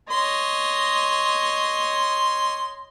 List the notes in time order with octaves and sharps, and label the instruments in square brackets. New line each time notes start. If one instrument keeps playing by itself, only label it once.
[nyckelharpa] C#5 D#5 [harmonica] C6